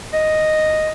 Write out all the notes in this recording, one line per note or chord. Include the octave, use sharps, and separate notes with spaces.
D#5